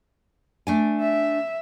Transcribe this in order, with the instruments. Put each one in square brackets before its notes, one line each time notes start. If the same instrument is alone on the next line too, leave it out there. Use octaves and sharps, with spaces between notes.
[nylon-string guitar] A3 D4 G#5
[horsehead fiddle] E5